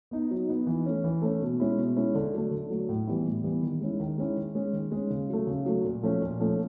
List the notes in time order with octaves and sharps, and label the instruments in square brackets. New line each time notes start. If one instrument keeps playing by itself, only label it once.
[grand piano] B3 D#4
F#3
B3 D#4
E3
A3 C#4
E3
A3 C#4
B2
G#3 C#4 E4
B2
G#3 C#4 E4
D3
F#3 A3
D3
F#3 A3
A2
E3 G3 B3 E4
A2
E3 G3 B3 E4
D#3
G#3 C#4 E4
D#3
G#3 C#4 E4
D#3
G#3 C#4
D#3
G#3 C#4
C#3
F#3 A3
C#3
F#3 A3
A#2
F3 A3 C#4
A#2
F3 A3 C#4